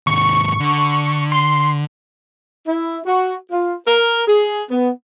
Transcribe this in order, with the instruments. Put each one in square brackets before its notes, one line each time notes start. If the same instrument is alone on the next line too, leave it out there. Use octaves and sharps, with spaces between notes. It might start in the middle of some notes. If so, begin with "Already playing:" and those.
[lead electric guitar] D#2 G#2 [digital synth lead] C#6
[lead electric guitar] D3
[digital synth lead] C6
[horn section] E4
F#4
F4
A#4
G#4
B3